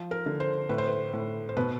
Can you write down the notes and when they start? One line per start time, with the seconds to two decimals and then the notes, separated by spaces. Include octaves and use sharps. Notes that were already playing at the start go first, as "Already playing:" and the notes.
Already playing: F3
0.11 A#4
0.26 D3
0.40 C5
0.69 A2 B4
0.78 C5
0.87 B4
1.13 A2
1.49 C5
1.57 B2 B4